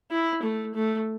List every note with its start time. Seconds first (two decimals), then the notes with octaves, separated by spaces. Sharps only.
0.11 E4
0.42 A3
0.75 A3